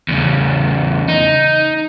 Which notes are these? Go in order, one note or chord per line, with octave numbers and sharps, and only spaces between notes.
E2 C#3
D#4